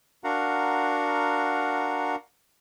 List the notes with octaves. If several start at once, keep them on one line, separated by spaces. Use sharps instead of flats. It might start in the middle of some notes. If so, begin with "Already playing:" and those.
D4 F#4 A#4 F5 F#5 A#5